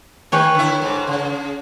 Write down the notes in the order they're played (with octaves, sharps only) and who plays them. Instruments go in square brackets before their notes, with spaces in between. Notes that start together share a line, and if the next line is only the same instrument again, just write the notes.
[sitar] D#3 [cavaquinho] B4 C#5 G5
[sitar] D3 E4
G#2
C#3